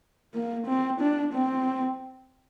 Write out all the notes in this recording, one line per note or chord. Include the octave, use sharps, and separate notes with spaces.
A#3
C4
D4
C4